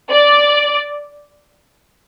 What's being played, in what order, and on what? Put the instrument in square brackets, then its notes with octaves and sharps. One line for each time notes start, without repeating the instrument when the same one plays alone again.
[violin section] D5